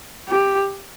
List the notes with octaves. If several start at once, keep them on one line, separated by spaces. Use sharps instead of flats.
G4